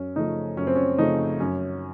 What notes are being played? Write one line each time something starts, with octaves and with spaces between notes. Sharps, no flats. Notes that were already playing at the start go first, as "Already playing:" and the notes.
Already playing: F#2 C#4
C#3 F3 A3 D#4
F#2 C#4
C4
C#4
C#3 F3 A3 D#4
F#2 C#4